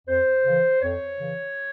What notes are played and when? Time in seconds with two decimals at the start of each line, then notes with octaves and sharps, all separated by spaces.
0.08 F2 C5
0.44 C#3 E3
0.81 F2 C#5
1.18 C#3 E3